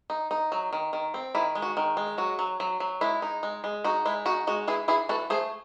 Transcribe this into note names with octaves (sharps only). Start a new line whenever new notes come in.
D#4
D#4
F#3
D#3
D#3
C4
D#3 E4
G#3
F#4
D#3
G#3
F#3 F#4
F#3
F#3
F#3
G#3 E4
D#4
G#3
G#3
D#4 F#4
G#3 E4
D#4 F#4
G#3 F#4
E3 E4 G#4
E3 E4 G#4
E3 F#4 A4
A3 G#4 C5